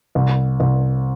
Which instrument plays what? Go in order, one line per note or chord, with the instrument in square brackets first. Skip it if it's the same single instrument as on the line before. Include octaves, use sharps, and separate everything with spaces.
[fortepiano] C2
C2